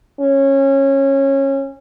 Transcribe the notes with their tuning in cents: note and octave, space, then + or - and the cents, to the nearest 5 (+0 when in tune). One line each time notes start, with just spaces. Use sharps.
C#4 -20